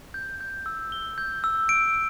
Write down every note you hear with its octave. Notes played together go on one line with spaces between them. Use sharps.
G6
G6
E6
G7
G6
E6
D7